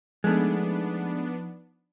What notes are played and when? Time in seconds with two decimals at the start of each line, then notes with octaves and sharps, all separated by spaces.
0.24 F3 G#3 A3 B3 D4 D#4